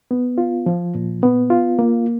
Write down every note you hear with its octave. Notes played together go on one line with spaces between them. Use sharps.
B3
F4
F3
A#2
B3
F4
A#3